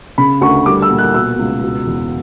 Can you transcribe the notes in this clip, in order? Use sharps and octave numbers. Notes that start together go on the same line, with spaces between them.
C#3 B5
D2 C#6
G3 D6
E6
A#2
F#6
B2 E6
C#2
B2
E2